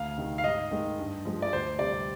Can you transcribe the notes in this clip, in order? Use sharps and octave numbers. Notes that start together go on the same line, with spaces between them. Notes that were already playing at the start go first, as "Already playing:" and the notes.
Already playing: D2 F5
C3 D#3
F5
G#2 D#5
D#3 G#3
G2
F3 G#3
D5
D2 C5
C3 G3 D5